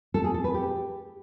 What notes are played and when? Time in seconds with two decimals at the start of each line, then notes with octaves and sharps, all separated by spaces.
0.14 A4
0.24 G#4
0.34 A4
0.44 B4
0.54 G4